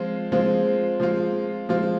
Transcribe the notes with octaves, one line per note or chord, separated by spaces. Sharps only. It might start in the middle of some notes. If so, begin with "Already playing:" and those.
Already playing: F3 G#3 C4 F4
F3 G#3 C4 F4
F3 G#3 C4 F4
F3 G#3 C4 F4